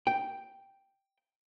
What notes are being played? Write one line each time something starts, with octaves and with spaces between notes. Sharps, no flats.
G5